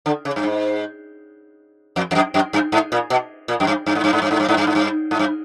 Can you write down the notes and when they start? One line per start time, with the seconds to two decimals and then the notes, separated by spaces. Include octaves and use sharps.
0.06 D3
0.25 C#3
0.36 G2
0.44 G#2
1.96 F2
2.11 F2
2.15 F#2
2.34 F#2
2.53 G2
2.72 G#2
2.92 A#2
3.10 B2
3.48 A#2
3.60 F#2
3.67 G2
3.86 G2
3.95 G#2
4.04 G2
4.13 G#2
4.22 G2
4.31 G#2
4.40 G2
4.48 G#2
4.57 G2
4.67 G#2
4.75 G2
5.11 G#2
5.19 G2